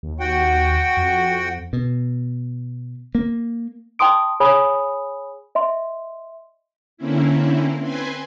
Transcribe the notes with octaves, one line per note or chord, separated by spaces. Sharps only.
D#2
F#4 F#5 G5
F2
B2
A#3
G5 A5 C6 D#6 D7
G#4 C#5 G#5 B5 D#6
D#5 E5 C6
D3 A#3 C4 C#4 E4
C4 B4 C5 G#5